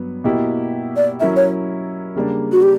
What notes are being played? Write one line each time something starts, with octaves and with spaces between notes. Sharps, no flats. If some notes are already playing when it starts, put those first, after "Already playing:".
Already playing: G2 F#3 B3
B2 A#3 E4 G4
D5
F#3 C#4 E4 A#4 E5
C#5
C#3 G3 A#3 D4
F#4
G4